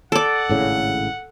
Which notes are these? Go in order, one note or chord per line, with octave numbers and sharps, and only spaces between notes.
A4 D5 F#5
G#1 A2 C#3